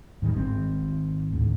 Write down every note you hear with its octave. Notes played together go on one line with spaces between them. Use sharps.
G#2 D#3 G3
G#1 C4
D2 G#2